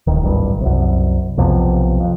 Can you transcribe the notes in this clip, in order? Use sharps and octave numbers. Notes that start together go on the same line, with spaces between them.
D1 D#3
D1 G#1 G2
C2 F#2
B1 F2 C3
F2